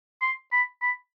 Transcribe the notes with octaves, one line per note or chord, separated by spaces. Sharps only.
C6
B5
B5